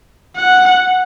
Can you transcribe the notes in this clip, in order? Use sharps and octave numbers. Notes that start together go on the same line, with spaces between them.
F#5